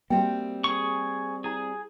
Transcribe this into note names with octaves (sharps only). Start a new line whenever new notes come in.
G3 A#3 C4 F#4 E5 G5
G#4 C#6
E4 G#4 A#5